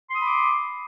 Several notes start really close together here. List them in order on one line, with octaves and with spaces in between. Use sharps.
C6 D#6 B5 D6